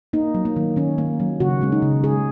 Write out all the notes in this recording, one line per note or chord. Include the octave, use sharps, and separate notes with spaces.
A#3 D#4
F#3
A#3
D#3
D#3 C#4
A#3
F#3
C#3 F#4
G#3 C#4
D#4
C#3
G#3 G#4